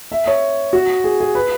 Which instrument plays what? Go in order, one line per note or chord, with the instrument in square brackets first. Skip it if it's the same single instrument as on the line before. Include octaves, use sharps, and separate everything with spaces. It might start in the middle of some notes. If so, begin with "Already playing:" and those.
[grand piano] E5
C#5
F#4
G#4
G#4
B4